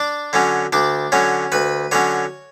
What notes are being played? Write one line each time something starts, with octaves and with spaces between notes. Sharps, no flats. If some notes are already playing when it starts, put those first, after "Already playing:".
Already playing: D4 D5
D3 F#3 C#4
D2 D4 D5
D3 F#3 C#4 C#5
D2 B4 B5
D3 F#3 C#4 C#5 C#6